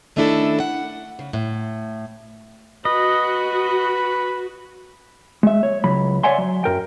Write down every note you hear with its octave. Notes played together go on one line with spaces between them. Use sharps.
D#3 A3 C#4 D4 E4 A4
F#5
C#3
A2
F#4 B4 D#5
G#3 E5
C#5
C#2 F#3 B5
C#5 D5 E5 F#5 G#5 C6
F#3
F#2 A#4 G5